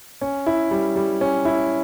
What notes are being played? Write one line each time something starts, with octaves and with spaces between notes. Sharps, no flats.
C#4
E4
G3
G3
C#4
E4